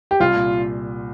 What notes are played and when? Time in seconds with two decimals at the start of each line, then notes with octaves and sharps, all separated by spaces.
0.11 G4
0.20 C2 F4
0.35 A#2